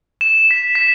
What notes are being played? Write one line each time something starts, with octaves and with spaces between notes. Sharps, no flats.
E7
B6
B6